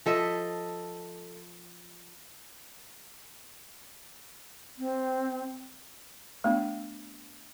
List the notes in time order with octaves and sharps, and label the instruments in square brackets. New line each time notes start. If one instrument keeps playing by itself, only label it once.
[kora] F3 A4 D#5 E5
[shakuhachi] C4
[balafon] A3 B3 D4